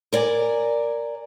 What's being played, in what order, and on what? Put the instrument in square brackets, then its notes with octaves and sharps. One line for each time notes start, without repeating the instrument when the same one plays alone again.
[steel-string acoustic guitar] A#4 D5 G#5 A#5